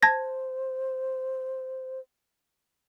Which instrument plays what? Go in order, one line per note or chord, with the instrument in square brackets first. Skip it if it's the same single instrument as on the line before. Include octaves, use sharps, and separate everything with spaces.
[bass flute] C5 [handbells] A5 G#6 A#6